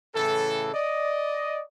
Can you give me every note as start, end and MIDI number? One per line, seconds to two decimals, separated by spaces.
0.16 0.70 45
0.16 0.70 49
0.16 0.70 52
0.16 0.70 69
0.74 1.61 74
0.74 1.61 75